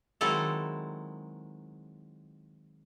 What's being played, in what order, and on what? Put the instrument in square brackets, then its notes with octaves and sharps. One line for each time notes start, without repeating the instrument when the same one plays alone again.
[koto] D#3 F#3 G#3 C4 E4 A4